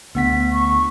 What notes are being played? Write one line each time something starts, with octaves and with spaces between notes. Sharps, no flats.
D2 B3 F#5 B6
C#6